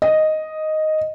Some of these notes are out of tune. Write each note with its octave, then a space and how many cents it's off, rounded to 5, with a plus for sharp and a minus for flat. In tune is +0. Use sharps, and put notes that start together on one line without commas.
D#5 +0